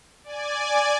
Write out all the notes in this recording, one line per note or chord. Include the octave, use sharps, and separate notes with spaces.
D5 G#5